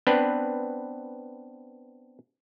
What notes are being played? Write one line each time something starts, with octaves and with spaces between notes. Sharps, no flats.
B3 C4 D4 B4